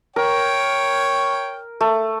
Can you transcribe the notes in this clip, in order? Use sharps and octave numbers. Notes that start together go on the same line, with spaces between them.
A#4 C#5 G5
A3